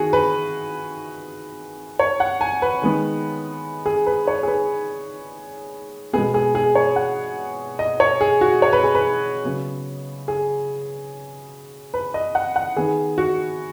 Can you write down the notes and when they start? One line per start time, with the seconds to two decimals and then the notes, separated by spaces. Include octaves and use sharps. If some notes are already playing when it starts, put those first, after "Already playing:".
Already playing: D#3 B3 F#4 G#4
0.13 B4
1.99 C#5
2.20 F#5
2.41 G#5
2.62 B4
2.82 D#3 G#3 B3
3.86 G#4
4.07 B4
4.28 C#5
4.43 G#4
4.48 B4
6.13 B2 G#3 B3 G#4
6.34 G#4
6.55 G#4
6.75 C#5
6.96 F#5
7.79 D#5
8.00 C#5
8.21 G#4
8.41 F#4
8.62 C#5
8.73 B4
8.84 G#4
8.95 B4
9.45 C#3 F#3 B3
10.28 G#4
11.94 B4
12.14 D#5
12.35 F#5
12.56 F#5
12.76 D#3 B3 G#4
13.18 F#4